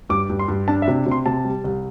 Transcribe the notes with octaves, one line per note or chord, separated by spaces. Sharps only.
G2 D6
G2
C6
G2
D4 A5
E5
C3
C3
C6
C3 A5
G3
C2